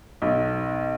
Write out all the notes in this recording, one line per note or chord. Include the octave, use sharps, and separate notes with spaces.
B1